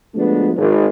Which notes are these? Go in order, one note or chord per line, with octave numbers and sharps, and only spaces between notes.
D2 F3 G#3 A3 B3 D4
G#1